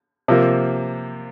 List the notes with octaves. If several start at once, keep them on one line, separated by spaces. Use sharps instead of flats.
C3 F3 A#3